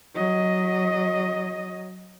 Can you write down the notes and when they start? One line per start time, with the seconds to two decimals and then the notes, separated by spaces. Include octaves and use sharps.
0.15 F#3 D#5